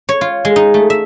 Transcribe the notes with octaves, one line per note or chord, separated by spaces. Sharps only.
C#5
F4
G#3
D#4
A3
E5